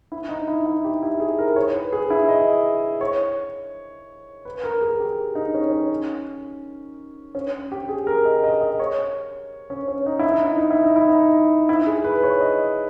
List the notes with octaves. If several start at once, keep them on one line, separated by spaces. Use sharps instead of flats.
E4
D#4
E4
E4
G4
E4
G#4
A#4
C#5
B4
G#4
E4
D#5
C#5
B4
A#4
G#4
G4
D#4
C#4
C#4
C#4
G4
G#4
A#4
D#5
D#5
D#5
C#5
C#4
C#4
D#4
E4
D#4
E4
D#4
E4
D#4
E4
D#4
E4
G#4
B4
C#5
D#5